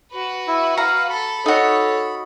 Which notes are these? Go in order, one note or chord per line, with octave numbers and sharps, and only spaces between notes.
F#4 B4
E4
F5 A#5
A4 B5
D#4 F#4 A4 C#5